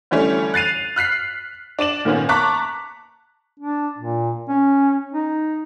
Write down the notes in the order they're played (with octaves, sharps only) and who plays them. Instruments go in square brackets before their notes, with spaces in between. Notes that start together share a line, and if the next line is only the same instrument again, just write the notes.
[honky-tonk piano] D3 E3 G3 A3 C#4
F#6 A6 C7 D#7 F7
F6 F#6 B6 C7
D4 D5 E7 F#7
A#2 D#3 A#3 B3 C#4
A5 A#5 C#6 D6 F#6 B6
[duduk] D4
A#2
C#4
D#4